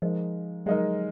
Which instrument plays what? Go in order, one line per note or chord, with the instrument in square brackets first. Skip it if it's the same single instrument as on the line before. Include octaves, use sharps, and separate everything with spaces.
[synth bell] F3 [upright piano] G#3 D#4 A#4
[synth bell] F#3 [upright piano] G#3 D#4 A#4